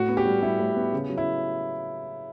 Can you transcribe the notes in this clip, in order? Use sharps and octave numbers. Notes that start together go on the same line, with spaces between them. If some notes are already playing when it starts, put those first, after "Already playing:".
Already playing: A2 F#4
B3
G4
G3
G3 E4
A2
B3
C#3
F#3
E4